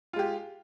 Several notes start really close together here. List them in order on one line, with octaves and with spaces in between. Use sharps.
F4 G#3 G4